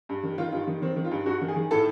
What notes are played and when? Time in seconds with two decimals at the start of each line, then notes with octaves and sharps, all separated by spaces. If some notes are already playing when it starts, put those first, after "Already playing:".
0.09 G2
0.23 D#3
0.38 D#3 F4
0.52 G2 F4
0.67 D#3
0.82 D#3 C4
0.96 D#3
1.05 F4
1.11 G2
1.26 G2 F#4
1.41 D#3
1.48 G#4
1.56 D#3
1.71 A2 A4